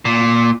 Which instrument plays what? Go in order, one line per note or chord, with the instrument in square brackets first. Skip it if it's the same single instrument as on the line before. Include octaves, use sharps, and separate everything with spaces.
[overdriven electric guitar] A#2